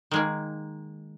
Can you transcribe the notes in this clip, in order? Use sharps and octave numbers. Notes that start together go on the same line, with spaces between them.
D#3 G#3 A#3